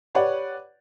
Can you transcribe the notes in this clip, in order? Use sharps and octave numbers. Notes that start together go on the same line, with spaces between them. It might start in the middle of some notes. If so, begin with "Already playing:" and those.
G4 B4 C#5 D5 F#5